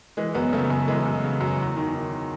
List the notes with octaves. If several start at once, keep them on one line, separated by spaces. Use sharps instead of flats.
E3 G#3
F#2 B3
C#3 A3
F#2 A3
E3 G#3
F#2
C#3
F#2
E2
D#3
D#3